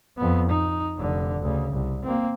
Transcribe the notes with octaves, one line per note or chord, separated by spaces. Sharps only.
F2 B3
D#4
F1 D3
D2 C#3
C2
A#3 C4